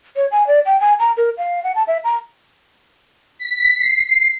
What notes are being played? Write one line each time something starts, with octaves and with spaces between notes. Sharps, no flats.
C#5
G#5
D5
G5
G#5
A#5
A#4
F5
F#5
A5
E5
A#5
B6
C7